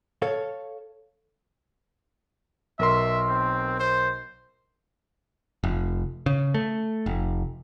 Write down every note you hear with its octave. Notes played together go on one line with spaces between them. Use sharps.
A4 C#5 F5
B1 A#4 E5 C6
C4
C5
F1
C#3
A3
F1